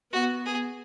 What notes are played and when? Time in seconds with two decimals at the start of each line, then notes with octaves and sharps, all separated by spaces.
0.13 B3 F#4
0.46 G#4